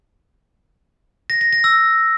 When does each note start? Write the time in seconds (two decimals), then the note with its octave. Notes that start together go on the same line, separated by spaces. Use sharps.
1.30 A#6
1.41 A#6
1.53 A#6
1.64 E6